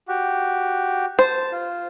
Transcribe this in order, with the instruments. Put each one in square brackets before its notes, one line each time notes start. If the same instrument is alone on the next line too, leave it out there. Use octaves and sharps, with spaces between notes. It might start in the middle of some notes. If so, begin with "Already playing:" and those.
[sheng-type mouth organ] F#4 G4
[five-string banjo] C5 [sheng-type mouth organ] A5
[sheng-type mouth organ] F4